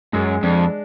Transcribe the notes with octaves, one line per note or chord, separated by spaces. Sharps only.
F#2 G#3
F2 D4